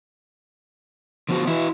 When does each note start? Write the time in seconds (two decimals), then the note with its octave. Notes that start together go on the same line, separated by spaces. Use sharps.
1.29 D3 F3 B3 F#4
1.47 E3 E4 F#4 E5